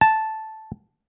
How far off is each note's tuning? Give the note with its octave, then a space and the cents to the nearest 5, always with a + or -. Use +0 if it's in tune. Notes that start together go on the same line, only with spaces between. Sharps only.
A5 -5